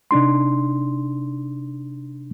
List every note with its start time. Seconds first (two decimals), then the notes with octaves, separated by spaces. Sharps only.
0.11 C3 D4 D#4 C6